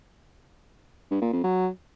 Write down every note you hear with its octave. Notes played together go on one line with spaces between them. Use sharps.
G2
A#2
F2
F#3